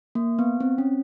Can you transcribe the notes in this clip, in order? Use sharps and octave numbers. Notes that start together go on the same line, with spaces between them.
A#3
B3
C4
C#4